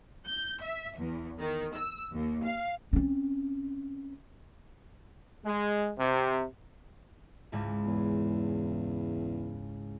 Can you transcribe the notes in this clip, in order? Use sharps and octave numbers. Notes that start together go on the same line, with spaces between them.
G6
E5
E2
D#3
E6
D#2
F5
C4 C#4
G#3
C3
C#2 G#2 E4
E2